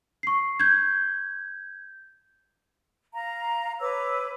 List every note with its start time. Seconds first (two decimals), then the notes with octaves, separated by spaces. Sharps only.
0.23 C#6 C7
0.60 G6 G#6
3.13 F5 A#5
3.80 B4 C#5 D6 E6